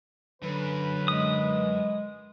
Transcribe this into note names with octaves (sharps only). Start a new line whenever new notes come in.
F#2 D3 B4
G#3 D#6